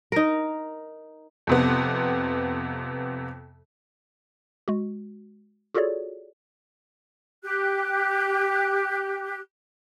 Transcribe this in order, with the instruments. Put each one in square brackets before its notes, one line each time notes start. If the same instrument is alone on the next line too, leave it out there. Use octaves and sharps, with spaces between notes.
[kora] D#4 A#4
[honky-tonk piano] F2 C3 B3
[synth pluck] G#3 F#4
F4 F#4 G#4 A4 C#5 D5
[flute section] G4 F#6